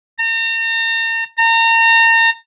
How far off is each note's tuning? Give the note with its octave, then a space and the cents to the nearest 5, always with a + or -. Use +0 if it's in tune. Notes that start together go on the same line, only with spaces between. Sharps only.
A#5 -40
A#5 -35